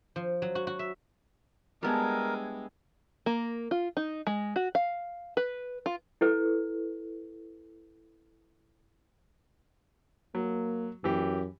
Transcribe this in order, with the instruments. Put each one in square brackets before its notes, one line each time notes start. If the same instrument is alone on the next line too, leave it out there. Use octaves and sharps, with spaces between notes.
[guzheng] F3
F#3
F#4
F#4
E5
[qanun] G3 B3 [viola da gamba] G#3 [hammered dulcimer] D4 E4 G#5 [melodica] A#4
[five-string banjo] A#3
F4
D#4
G#3
F#4
F5
B4
F4
[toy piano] E4 A4 B4
[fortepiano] F#3 [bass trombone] A#3
[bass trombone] F#2 [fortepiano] E3 G4